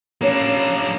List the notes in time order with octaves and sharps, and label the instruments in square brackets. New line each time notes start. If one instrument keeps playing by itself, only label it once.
[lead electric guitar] A#3 D4 [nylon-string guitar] C#4 C#5